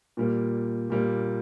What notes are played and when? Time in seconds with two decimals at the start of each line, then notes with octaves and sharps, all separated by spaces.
0.17 A#2 G3 A#3
0.90 A#2 G3 A#3